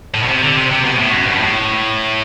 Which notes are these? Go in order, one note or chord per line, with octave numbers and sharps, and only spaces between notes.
A2
B2
C3
D3
C3
C3
B2
A2
F#2
G2
B2
A2